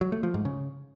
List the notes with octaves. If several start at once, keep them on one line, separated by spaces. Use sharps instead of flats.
F#3
A3
F3
G#2
C#3